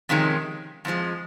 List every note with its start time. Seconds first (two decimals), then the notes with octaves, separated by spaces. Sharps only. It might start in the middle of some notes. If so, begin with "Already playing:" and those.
0.09 F2 C3 D#3 G#3 C#4
0.85 F2 D3 F3 G#3